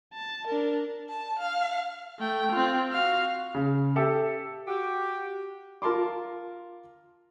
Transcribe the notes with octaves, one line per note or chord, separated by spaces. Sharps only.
A5
D4 A#4
A5
F5
A3 G5
C4 F4
F#4 F5
C#3
G4 A4 E5
F#4 G4
F4 A#4 A5 C6 D6